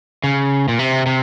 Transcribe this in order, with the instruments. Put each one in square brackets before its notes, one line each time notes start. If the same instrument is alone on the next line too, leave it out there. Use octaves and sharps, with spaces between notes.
[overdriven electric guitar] C#3
A#2
C3
C3